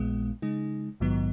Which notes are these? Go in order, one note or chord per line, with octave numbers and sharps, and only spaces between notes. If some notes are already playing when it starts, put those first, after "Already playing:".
Already playing: A#1 A#2 G#3 B3
C#3 G#3 D#4
A#1 G#2 D#3 F#3 B3